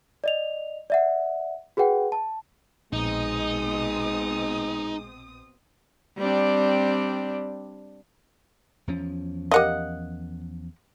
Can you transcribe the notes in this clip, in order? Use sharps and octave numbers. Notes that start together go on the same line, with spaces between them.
D5 D#5 F7
D5 E5 F#5
F#4 G#4 B4 F#5 G5
A5
A#1 B2 G#3 C4 D#4 D#6
G3 C4 D4
E2 F3 C#4
G4 A#4 D#5 F5 F#5